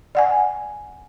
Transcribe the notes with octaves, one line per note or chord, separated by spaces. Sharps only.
D5 F#5 G#5